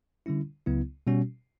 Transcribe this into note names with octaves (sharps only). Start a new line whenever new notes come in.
D3 G3 C#4 E4
C#2 C#3 F#3 B3 E4
B2 G3 C#4 F#4